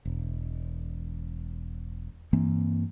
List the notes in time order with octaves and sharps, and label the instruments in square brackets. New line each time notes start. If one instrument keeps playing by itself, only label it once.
[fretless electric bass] E1
G2 E3 A#3 C4